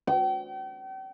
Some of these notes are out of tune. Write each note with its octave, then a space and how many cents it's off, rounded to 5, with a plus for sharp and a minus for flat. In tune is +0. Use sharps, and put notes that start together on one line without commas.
G5 -40